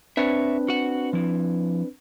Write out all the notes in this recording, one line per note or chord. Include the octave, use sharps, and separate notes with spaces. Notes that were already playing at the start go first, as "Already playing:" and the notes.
C4 D4 B4 C#5 E5
F#4 F#5
F3 E4